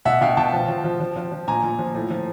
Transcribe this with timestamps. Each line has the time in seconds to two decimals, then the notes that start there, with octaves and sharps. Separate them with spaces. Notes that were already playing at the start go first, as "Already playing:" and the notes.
0.05 B2 E5 F#5
0.21 B2 F5 G5
0.37 B2 G5 A5
0.53 F3
0.68 F3
0.84 F3
1.00 F3
1.16 F3
1.32 F3
1.48 A#2 G#5 A#5
1.64 A#2
1.79 F3
1.95 A2
2.10 F3